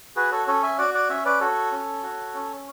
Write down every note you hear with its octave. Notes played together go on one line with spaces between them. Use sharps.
F#4 G#4 B4
A4 C#5
C#4 A4 C#5
E5 G#5
F#4 D5 F#5
D5 F#5
C#4 C#5 E5
B4 D5
F#4 A4 C#5
C#4
F#4
C#4